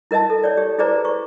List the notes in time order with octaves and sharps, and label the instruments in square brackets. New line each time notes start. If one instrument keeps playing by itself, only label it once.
[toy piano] E4 A#4 D#5 E5 A5
A4
C#5 D5
G4
E4 G#4 B4 C5 D5 A#5
C#6